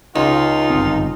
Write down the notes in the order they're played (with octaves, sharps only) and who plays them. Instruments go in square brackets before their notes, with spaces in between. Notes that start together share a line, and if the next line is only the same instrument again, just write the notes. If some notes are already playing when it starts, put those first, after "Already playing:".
[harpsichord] C#2 [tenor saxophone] D#4 [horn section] F4
[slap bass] G1 F#2 C4